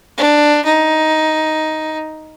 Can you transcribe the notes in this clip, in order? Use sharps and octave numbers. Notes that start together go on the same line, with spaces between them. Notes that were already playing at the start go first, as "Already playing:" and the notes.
D4
D#4